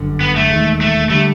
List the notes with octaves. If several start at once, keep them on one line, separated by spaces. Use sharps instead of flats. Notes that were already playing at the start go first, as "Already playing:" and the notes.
Already playing: G1 F#2 D3
B3
A3
E1 D#2 D#3 G#3
A3
D3 G3 A3